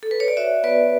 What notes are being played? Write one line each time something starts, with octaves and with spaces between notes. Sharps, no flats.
A4
B4
C#5
D5
F#4 C#5 E5
B3 B4 D5